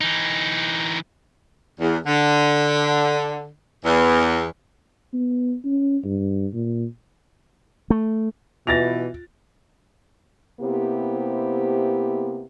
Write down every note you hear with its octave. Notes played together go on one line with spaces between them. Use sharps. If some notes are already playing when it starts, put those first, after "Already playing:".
E3 D#4
E2
D3
E2
B3
C#4
G2
A#2
A3
B2 E3 F4 A6 A#6 F7
C3 A#3 B3 E4 G4 C5